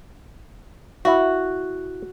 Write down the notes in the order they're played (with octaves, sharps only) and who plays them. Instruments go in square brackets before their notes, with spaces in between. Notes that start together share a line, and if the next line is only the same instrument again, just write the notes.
[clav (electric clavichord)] E4 E5 [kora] F#4